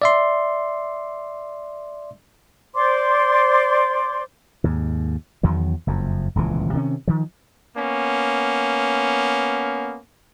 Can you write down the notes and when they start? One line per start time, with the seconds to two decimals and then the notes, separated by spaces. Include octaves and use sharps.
0.02 D5 E5 C6
2.75 C5 D5 C6 D6
4.64 D#2 G#2
5.43 E2 D#3 F#3
5.87 F#1 F2
6.35 D#1 C#2 C3 E3
6.73 C3 D#3 C4 C#4
7.08 D#3 F3
7.77 A#3 B3 C#4